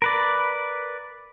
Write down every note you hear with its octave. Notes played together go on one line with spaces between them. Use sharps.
A#4 B4 D5